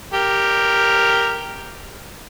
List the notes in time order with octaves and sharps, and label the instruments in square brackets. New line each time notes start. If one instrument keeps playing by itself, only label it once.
[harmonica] G4 A#4